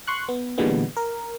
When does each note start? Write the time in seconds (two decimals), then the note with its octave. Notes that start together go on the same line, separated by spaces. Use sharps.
0.07 C6 C#6 F#6
0.29 B3
0.58 A#2 D3 E3 G3 G#3 B3
0.97 A#4